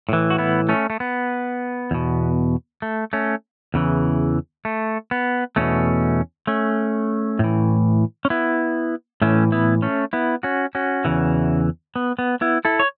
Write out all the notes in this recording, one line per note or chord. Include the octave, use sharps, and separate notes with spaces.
A2 E3
F#4
B3 E4
A3 C#4
A3
B3
E2 B2
A3
A3 C#4
E2 C#3 E3
A3
B3
E2 B2 A3 C#4
A3 C#4
A2 E3
C#4
B3 E4
A2 E3 A3 C#4
B3 E4
A3 C#4
B3 E4
C#4 F#4
C#4 F#4
E2 C#3 E3
B3
B3
B3 E4
E4 A4
C#5